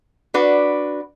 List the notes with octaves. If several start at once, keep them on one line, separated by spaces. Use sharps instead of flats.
D4 F#4 B4